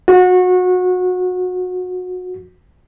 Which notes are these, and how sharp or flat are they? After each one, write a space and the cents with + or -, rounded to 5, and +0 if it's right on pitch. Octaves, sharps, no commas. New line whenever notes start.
F#4 -25